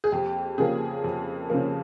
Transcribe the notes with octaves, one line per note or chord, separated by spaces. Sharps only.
G#4
F2 G4
C#3 F3 A#3 G#4
F2
C#3 F3 A#3